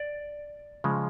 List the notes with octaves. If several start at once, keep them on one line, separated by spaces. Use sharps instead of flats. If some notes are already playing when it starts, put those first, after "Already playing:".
Already playing: D5
C#3 F3 G#3